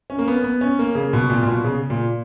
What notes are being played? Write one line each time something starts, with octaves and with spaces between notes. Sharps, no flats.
C#4
A#3
B3
B3
C#4
A#3
C#3
B2
A#2
A#2
B2
C#3
A#2